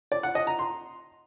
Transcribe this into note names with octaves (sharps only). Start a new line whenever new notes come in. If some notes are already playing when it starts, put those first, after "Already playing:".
D5
F#5
D#5
A#5
C6